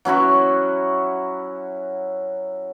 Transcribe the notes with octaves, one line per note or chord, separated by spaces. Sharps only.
F#3 C#4 E4 F#4